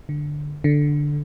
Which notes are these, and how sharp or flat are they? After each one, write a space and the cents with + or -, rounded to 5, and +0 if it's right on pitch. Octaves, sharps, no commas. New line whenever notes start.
D3 +5
D3 +0